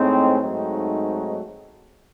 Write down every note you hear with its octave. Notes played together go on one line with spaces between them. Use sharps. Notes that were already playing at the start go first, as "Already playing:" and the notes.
Already playing: A2 G#3 C4 D#4
G#2 F#3 A3 C4 D#4